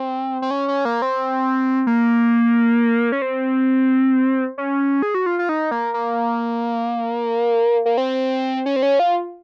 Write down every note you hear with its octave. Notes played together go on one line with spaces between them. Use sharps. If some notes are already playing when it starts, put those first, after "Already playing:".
Already playing: C4
C4
C#4
C#4
A#3
C4
A#3
C#4
C4
C#4
G#4
F#4
F4
F4
D#4
A#3
A#3
A#3
C4
C#4
C4
C#4
F4